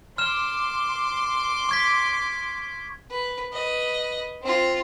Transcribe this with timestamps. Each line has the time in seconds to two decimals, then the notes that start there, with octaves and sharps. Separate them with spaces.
0.18 C6 D6 F6 E7
1.69 C#6 G#6 B6
3.10 B4
3.53 B4 D#5
4.42 C4 F4